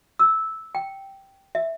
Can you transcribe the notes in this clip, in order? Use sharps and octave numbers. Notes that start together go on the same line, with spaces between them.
E6
G5
E5